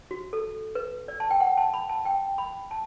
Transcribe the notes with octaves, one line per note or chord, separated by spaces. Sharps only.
F#4
A4
B4
D5
A5
G5
F#5
A5
B5
A5
G5
B5
A5